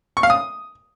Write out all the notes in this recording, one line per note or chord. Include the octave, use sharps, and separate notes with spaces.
C#6
F5
D#6